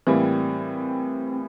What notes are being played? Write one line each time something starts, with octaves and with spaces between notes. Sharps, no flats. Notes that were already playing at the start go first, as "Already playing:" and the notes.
A2 E3 G3 A#3 C4